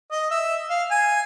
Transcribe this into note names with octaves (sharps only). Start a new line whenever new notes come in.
D#5
E5
F5
G#5